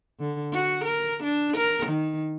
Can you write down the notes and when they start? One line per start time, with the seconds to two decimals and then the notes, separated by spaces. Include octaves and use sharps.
0.20 D3
0.53 F#4
0.84 A#4
1.23 D4
1.57 A#4
1.86 D#3